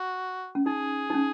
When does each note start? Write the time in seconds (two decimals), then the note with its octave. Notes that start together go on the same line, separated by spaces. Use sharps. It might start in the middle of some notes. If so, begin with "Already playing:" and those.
Already playing: F#4
0.55 C#4
0.66 D#4 G#4
1.10 D#4
1.14 C#4